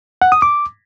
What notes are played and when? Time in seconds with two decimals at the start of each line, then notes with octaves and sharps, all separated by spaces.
0.22 F#5
0.32 D#6
0.42 D6